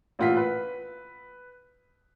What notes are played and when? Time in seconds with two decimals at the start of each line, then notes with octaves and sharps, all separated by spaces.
0.19 A1 A#2 F4 F#5 B6
0.37 B4